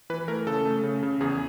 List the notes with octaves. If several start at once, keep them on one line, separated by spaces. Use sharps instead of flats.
E3 B4
A3 A#4
C#3 A4
A3
C#3
C#3
E2 G#4